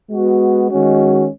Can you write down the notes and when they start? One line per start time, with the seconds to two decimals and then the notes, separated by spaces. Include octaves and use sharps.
0.10 G#3 B3 F#4
0.70 D#3 G#3 C#4 F#4